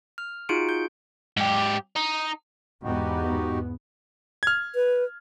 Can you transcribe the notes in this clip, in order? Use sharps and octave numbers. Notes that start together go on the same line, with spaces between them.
F6
D#4 F4 F#4 G#4 C#7 D7
G6
G#2 G4
D#4
E2 G#2 B3 D#4 F#4 G4
F6 G#6
B4